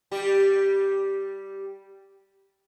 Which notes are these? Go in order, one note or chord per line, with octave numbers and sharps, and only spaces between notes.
G3 G4